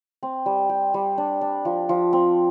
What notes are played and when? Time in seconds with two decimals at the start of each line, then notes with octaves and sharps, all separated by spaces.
0.23 C4
0.46 G3
0.69 G4
0.94 G3
1.18 D4
1.41 D4
1.65 F3
1.89 F3
2.13 C4